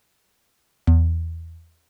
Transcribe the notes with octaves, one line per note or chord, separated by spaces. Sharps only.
E2